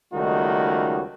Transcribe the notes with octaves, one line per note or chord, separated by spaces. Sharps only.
C#2 D#3 G3 A3 D#4 F#4